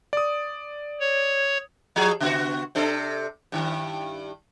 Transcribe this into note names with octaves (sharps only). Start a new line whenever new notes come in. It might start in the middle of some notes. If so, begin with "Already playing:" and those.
D5 D#6
C#5
F3 F#3 G#4
C#3 B3 F#4
C3 D4 A4
G2 D#3